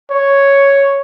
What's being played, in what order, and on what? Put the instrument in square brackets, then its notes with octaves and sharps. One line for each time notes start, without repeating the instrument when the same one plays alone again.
[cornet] C#5